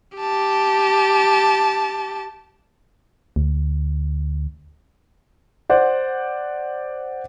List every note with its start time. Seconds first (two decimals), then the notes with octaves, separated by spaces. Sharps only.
0.17 G4 A5
3.36 D2
5.70 C5 D5 F#5